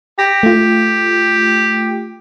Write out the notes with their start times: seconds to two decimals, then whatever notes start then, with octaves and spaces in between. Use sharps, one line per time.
0.19 G4 A#6
0.43 A3 F4